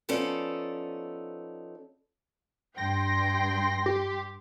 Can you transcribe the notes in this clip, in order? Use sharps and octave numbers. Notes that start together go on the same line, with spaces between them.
F3 B3 C#4 D#4 A4 D5
G2 G5 C6 A#6
G4